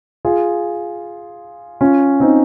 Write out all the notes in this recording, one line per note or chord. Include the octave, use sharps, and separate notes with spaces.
F4 G#4
C#4 F4
C4 D#4